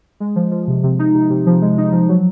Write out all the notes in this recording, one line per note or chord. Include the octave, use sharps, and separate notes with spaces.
G#3
F3
F3
C3
C3
D#4
C3
C3
F3
G#3
D#4
F3
F#3